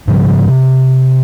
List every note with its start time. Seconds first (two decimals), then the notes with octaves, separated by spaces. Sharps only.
0.08 G#2 C#3 F3 G3
0.48 C3